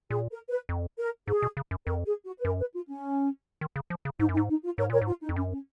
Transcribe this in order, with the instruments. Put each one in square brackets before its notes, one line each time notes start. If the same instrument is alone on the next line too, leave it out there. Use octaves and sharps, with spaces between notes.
[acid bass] A#2 [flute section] G#4
[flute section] A#4
B4
[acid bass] F2
[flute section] A#4
[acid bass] G#2 [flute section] G#4
[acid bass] B2
C#3
F#2
[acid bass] F2 [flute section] A#4
[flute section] G#4
F#4
B4
[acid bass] F#2 [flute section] A#4
[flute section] B4
F4
C#4
[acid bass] D#3
C#3
F3
C#3
[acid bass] G#2 [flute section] D#4
[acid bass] F#2
[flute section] D#4
[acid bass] G#2
[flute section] D#4
F4
[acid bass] G#2 [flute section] A#4 C#5
[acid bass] A#2 [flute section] A#4 C#5
[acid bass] G#2
[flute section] F4
D#4
[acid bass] F2
[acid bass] F#2 [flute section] C#4
[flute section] C#4